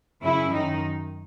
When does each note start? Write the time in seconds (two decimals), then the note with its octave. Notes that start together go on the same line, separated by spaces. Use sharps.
0.22 F#2 C#3 F#3 C#4 E4
0.51 F#2 D#3 D#4